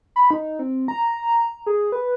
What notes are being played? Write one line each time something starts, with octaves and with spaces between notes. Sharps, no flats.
B5
D#4
C4
A#5
G#4
B4